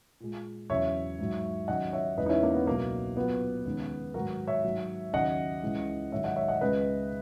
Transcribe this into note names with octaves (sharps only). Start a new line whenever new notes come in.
A#2 G#3
E2 C#3 F#3 C#5 E5
G#2 F#3
D#2 C#3 F#3 D#5 F#5
C#5 E5
E2 C#3 G#3 B4 D#5
D#4
C#4 E4
A#3 C#4
B3
C#2 B2 F#3 A#3
A#2 F#3 B3
D#2 C#3 G#3
G#2 D#3 F#3 F#4 A#4
C#5 E5
G#2 F#3
D#2 C#3 F#3 D#5 F#5
C#2 C#3 E3 G#3
G#2 D#3 F#3 C#5 E5
D#5 F#5
C#5 E5
D#5 F#5
C#2 C#3 G#3 B4 D#5